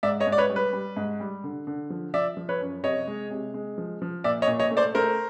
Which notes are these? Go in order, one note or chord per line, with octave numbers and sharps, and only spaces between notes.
G#2 D5 E5
C#5 D#5
G#2
D5
B4 C#5
G3
B4
G3
G#2
G3
D3
D3
F3
F3 D5 E5
F3
B4 C#5
F#2
C3 C#5 D#5
G#3
C3
G#3
F3
F3
A#2 D5 E5
C#5 D#5
A#2
C#5 D#5
A3
C5 D5
A3 A#4 C5